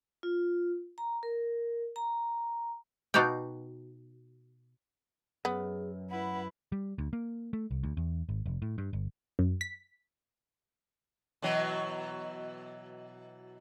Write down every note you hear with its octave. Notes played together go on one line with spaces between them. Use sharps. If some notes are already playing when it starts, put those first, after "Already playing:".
F4
A#5
A#4
A#5
B2 D#4 F#4 D5 F5 G5
F#2 B3 G#4
E4 B4 F#5
G3
D2
A#3
A3
C2
D2
E2
G#1
F1
A2
G2
G1
F#2
B6
B2 E3 F#3